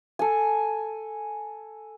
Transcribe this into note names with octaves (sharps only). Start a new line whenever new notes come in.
A4 G#5